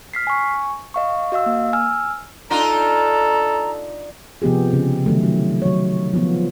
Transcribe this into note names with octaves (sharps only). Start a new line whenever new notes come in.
F6 B6 C7
G#5 C#6
D#5 F5 C#6
F#4 D#5 F5 E6
A#3
G#5 E6 F6
D4 D#4 F4 A4 A#5
C3 F3 B3 G4 G#4
C#3
D#3 F#3 A3
F#3
F#3 C#5
F3 B3 F4